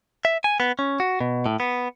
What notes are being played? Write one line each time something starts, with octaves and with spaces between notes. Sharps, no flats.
E5
G#5
B3
C#4
F#4
B2
A2
B3